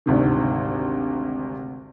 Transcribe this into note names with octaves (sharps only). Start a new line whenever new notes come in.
G#1 D2 C3 D#3